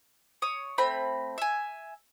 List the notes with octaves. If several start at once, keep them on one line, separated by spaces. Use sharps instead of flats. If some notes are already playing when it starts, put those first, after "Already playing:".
C#5 D#6
A3 C4 B5
E5 G#5